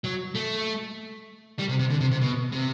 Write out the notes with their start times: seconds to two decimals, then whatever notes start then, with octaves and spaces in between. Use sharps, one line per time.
0.04 F#3
0.35 A3
1.59 G3
1.69 C3
1.79 C3
1.90 D3
2.01 C3
2.12 C3
2.22 B2
2.52 C3